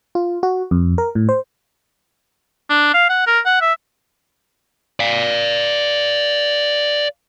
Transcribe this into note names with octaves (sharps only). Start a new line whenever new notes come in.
F4
F#4
F2
A#4
A2
C5
D4
F5
F#5
A#4
F#5
E5
D5 F5